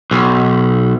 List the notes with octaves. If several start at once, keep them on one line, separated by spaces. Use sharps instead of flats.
B1